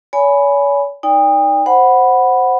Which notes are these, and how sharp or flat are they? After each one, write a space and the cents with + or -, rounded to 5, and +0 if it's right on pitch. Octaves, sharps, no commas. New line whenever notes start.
C#5 +40 G#5 +5 B5 +0
D#4 +0 D5 -15 G5 +40
C5 +0 F#5 +0 B5 +0